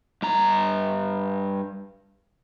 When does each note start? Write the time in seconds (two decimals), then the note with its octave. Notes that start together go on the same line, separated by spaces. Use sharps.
0.22 G2 A#5